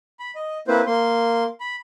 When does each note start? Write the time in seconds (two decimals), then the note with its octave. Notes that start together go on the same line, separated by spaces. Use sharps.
0.19 B5
0.36 D#5
0.68 A#3 C4 E4 B4 C5
0.87 A#3 C6
1.60 B5